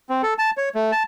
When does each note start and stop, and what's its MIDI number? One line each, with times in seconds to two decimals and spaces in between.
0.09 0.22 60
0.23 0.34 69
0.38 0.51 81
0.57 0.69 73
0.75 0.91 57
0.92 1.03 81